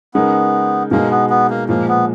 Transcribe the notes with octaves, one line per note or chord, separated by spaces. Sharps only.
C#3 G#3 B3 D#4 A#4
B2 G#3 A#3 D#4
B3
B3
A#3
A#2 F3 G#3 A#3
B3